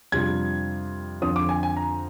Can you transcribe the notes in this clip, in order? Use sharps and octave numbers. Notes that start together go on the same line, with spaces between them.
F2 C3 G3 D4 F4 G#6
F2 D3 F3 C4 D#6
D6
G#5
G#5
A#5